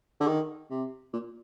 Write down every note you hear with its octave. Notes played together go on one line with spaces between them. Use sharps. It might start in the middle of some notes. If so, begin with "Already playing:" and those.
D3
D#3
C3
A#2